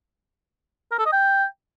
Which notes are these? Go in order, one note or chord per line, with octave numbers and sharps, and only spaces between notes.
A#4
A4
D#5
G5